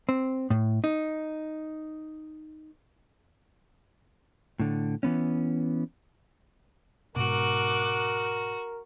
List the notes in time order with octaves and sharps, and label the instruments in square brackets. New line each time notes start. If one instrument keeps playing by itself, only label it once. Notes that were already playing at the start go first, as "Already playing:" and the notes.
[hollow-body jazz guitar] C4
A2
D#4
[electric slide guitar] A2 D3
E3 B3 C#4
[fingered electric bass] G#2 B2 [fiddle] F#4 [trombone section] A#4 [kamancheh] D6 F#6